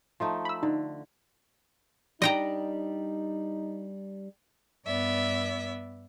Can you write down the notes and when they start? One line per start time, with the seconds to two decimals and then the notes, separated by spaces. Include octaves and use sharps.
0.20 F3 A3 D#4
0.45 B5 E6
0.63 D3 D#4
2.22 G3 D4 D#4 G4 D#5 G5 A#5
4.86 G2 B3 D5 E5